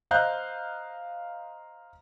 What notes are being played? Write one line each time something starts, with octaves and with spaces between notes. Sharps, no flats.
C5 D#5 F5 A#5 F#6 G6